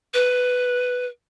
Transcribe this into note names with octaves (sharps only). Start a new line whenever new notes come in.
B4